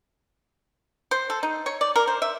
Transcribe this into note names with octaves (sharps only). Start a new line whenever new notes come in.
C5
A4
D#4
C#5
D5
A#4
C5
E5